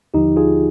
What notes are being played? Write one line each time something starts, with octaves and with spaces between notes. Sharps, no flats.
D#2 D3 F3 D#4 G4
F4 G#4